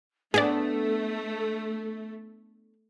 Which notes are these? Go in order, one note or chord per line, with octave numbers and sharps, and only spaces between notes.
A3 B3 D4 G#4 A4 D5